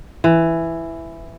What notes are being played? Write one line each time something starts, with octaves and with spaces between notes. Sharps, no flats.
E3